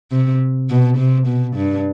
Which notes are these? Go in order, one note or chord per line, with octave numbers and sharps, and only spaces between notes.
C3
B2
C3
B2
G2